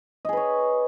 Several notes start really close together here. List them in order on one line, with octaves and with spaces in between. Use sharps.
D#5 G#4 B4 C#5